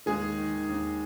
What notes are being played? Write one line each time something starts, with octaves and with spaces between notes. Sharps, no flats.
D#2 G#3 G#4
D#3
D#3
D#3
D#2